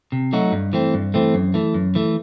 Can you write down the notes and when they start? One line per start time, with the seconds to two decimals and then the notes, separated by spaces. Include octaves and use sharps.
0.12 C3
0.33 F#3 A3 D#4 F#4
0.52 G2
0.73 E3 A3 C4
0.94 G2
1.14 E3 A3 C4
1.34 F#2
1.54 E3 A3
1.74 F#2
1.95 E3 A3